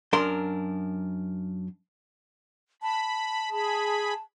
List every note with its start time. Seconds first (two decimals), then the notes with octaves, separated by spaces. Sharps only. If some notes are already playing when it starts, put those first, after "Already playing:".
0.13 F#2 D4 A#4 C6
2.82 A5 B5
3.51 G#4 B5